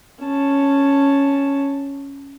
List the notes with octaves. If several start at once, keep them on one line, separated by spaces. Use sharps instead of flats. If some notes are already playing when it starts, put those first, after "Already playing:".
C#4 A5